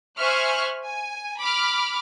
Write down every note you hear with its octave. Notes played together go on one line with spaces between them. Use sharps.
C5 E5 G#5 C#6 F6 F#6
G#5
B5 D6 F6